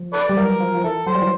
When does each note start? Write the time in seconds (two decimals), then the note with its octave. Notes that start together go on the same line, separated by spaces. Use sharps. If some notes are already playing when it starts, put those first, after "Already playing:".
Already playing: F3
0.13 A4 B4 D5
0.29 G3
0.37 E3 F#3 A#4
0.60 F3
0.74 F3
0.84 E3 A4
1.07 F#3 C5
1.15 G3
1.22 E3 F#3